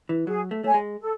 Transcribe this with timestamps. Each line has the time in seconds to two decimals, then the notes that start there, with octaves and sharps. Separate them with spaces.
0.09 E3
0.27 F#3 G#4
0.51 A3
0.63 A3 C#5 G#5
0.74 G#3
0.99 A4